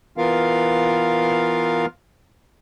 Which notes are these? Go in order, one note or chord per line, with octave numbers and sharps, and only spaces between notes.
E3 B3 F4 A#4 F5